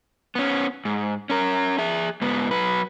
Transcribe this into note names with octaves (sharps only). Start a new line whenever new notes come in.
B3 C#4
G#2
C#4 A#4
G#4 E5
G#2 B3
F#3 B4